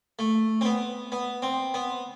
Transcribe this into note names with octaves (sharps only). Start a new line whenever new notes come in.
A3
C4
B3
B3
C4
B3